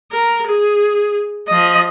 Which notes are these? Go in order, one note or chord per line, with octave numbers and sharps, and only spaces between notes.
A#4
G#4
F3 D#5